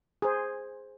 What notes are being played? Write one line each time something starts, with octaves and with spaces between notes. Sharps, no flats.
G#4 C5